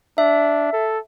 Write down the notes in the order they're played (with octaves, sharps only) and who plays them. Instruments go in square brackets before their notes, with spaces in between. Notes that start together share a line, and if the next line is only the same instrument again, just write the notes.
[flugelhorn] D4 [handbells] E5
[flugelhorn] A4